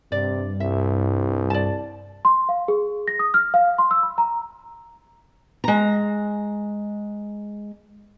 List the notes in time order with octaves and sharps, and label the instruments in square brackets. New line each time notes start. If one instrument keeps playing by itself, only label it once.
[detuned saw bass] G2 [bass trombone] C3 [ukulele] D5
[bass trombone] C2 [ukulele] E5
[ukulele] D5 A5
[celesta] C6
F5
G#4
A#6
D#6
F6
F5
C6
E6
B5
A#5
[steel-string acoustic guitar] G#3 A#5